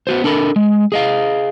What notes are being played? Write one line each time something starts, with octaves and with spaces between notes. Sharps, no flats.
B3 F#4 C5
D4 A4 A#4 B5
G#3
G#4 D#5 F5